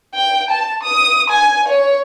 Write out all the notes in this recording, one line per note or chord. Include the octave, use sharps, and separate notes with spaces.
G5
A5
D#6
G#5
C#5